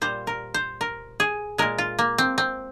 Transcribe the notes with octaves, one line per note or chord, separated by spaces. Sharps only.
A#2 G3 C5
A#4
C5
A#4
G#4
A#2 G#3 A#4
F4
A#3
C4
C4